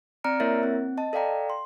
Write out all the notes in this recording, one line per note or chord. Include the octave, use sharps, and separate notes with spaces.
C4 D5 A#5 F6 C#7 D7
A#3 E4 A#4 C#5 E5 A6
C4
D#5 A5
A4 D5 F5 G5 A#5
C6